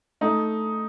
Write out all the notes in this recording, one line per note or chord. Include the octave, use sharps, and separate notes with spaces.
A3 D#4